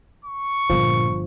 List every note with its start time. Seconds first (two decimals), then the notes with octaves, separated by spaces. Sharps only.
0.25 C#6
0.70 G1 A#2 D3 F3